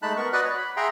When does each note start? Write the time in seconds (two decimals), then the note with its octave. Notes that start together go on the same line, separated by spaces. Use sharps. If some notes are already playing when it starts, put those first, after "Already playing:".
0.02 G#3 A3 D#4 A5 B5 F#6
0.17 B3 A#4 C#6
0.33 F#4 B4 D5 D#5 F#5 F#6
0.44 C#5
0.58 B5
0.77 G#4 E5 F#5 G5 A#5 C6